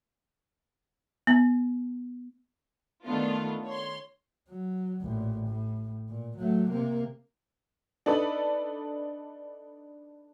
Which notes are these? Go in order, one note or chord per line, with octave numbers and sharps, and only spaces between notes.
B3
D#3 A3 B3 D4 F4
C#5 C6
F#3
A1 A#2
A2
A#2
F#3 A3
C3 A#3
D4 D#4 A4 B4 D5